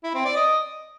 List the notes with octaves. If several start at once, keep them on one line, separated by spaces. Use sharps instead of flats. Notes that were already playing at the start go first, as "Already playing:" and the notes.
E4
C4
D5
D#5